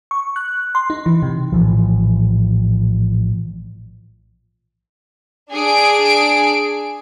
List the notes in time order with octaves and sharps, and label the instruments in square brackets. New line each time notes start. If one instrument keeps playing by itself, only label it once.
[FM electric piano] C#6
F#6
C6
D#4
E3
C3
[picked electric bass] A#1 A2 E3 F3
[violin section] D4 G#4 D7